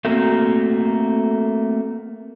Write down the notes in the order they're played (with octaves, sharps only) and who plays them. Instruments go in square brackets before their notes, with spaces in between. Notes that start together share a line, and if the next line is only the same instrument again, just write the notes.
[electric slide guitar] A3 A#3 C4 F#4 A4 A#4